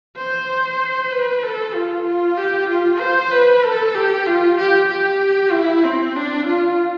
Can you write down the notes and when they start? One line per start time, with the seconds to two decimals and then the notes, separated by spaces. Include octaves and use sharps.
0.17 C5
1.11 B4
1.43 A4
1.74 F4
2.06 F4
2.37 G4
2.69 F4
3.00 C5
3.31 B4
3.63 A4
3.95 G4
4.26 F4
4.58 G4
4.89 G4
5.52 E4
5.84 C4
6.15 D4
6.46 F4